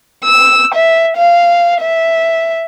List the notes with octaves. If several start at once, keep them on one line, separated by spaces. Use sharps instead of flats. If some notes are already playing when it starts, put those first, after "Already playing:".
E6
E5
F5
E5